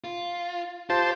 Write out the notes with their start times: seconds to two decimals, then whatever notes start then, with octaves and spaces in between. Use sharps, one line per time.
0.04 F4
0.90 F4 G4 C5 A5